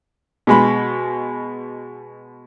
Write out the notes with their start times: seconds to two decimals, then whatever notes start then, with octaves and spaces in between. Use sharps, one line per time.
0.47 B2 G#3 B5